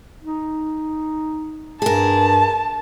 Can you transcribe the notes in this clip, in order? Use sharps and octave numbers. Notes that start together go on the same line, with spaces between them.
D#4
G2 G#4 A#4 A5